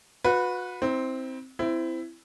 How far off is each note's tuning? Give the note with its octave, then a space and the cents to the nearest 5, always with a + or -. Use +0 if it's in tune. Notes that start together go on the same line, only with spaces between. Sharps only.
F#4 -35 B4 +0
C4 +0 E4 -40
C4 -15 E4 +10